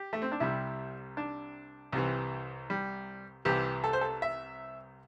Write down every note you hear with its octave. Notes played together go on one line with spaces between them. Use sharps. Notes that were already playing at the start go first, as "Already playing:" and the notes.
Already playing: G4
A3
C4
D4
C2 C3 G3 E4
D4
C2 C3 E3
G3
C2 C3 E3 G4
A4
C5
A4
E5